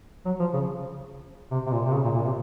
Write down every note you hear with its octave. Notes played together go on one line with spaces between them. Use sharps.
F#3
F3
C#3
C3
C3
A#2
C3
C#3
A#2
A#2
C3